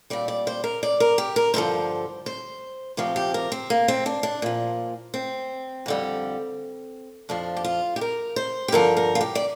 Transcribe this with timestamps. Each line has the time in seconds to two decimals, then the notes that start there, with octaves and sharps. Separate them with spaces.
0.10 A#2 G3 D5
0.28 D5
0.47 C5
0.64 A#4
0.83 D5
1.00 A#4
1.18 G4
1.36 A#4
1.54 G2 D3 F3 C5
2.26 C5
2.97 D2 C3 F3 G4
3.16 G4
3.34 A#4
3.52 C4
3.70 A#3
3.88 C4
4.06 D4
4.23 D4
4.42 A#2 F3
5.14 C4
5.86 F2 D3 G3
7.29 F2 F3 D4
7.57 G4
7.64 F4
7.96 G4
8.01 A#4
8.36 C5
8.68 G4
8.72 G2 D3 F3 A#4
8.97 A#4
9.15 F4
9.21 G4
9.35 D5